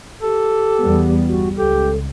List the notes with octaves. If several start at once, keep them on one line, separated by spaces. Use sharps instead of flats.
G4 A4
E2 G3 B3
G1 G3 F#4
C#2 G4 A4